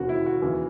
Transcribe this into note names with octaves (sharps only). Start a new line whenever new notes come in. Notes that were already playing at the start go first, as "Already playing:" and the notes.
Already playing: E1 D#2 C#3 F#4
E4
F#4
D#2 C#3 E3